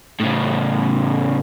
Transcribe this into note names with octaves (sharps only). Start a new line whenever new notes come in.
A2 C#3